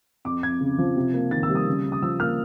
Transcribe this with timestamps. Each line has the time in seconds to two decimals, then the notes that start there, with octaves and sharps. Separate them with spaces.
0.25 F2 D6
0.43 F2 G#6
0.61 C#3
0.78 F3
0.96 C3
1.14 A#3
1.31 D#3 A6
1.43 E6
1.50 G3
1.55 D#6
1.67 C#3
1.85 C#3
1.92 D#6
2.03 F3 E6
2.20 A#3 F6